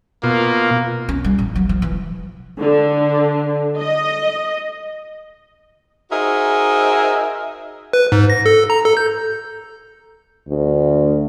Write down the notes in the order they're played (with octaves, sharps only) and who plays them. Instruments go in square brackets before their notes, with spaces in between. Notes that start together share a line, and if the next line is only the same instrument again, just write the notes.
[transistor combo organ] B2 F4 [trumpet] A#3
[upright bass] C#4
G3
A1
F#3
F3
E3
[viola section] D3
D#5
[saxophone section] D#4 F#4 G#4 A#4 C5 E5
[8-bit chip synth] B4
G#2
A#6
A4
A#5
A4
G6
[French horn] D2